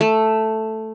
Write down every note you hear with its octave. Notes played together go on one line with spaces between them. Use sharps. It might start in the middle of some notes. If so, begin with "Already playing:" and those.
A3